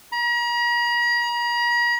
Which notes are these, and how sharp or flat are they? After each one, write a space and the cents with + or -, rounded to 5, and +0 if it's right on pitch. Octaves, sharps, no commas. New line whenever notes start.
A#5 +40